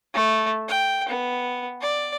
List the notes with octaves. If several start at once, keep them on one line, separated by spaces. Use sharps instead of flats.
A3
G5
B3
D5